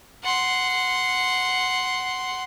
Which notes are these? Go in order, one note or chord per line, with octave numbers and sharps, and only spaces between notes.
F#5 C6